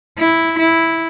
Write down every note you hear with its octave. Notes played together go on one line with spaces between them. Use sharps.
E4
E4